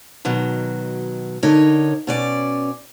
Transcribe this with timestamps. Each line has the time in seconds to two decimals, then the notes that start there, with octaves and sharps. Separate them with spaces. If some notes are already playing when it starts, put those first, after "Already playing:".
0.25 B2 D#3 F#3
1.43 D3 D#4 A#4 C#5 D#5
2.07 B2 C#4 D5